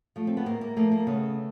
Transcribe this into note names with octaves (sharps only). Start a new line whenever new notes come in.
F3 A3
C4
B3
A2 A#3
A#3
F3 A3 A#3
A#3
C#3 A3 B3